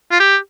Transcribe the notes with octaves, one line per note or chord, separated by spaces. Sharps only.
F4
G4